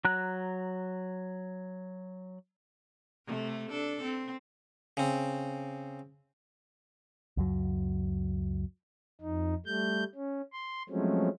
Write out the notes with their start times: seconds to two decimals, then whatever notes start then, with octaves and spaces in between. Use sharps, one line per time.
0.05 F#3 A#5 F#6
3.26 C3 A3
3.70 D4 A4
4.03 C4
4.97 C#3 C4
7.37 C#2 F#2 F#3
9.21 F2 D#4
9.66 G3 A3 G6
10.15 C#4
10.52 C6
10.89 F3 F#3 G#3 A3 C4 C#4